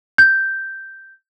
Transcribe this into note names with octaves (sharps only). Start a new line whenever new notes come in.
G6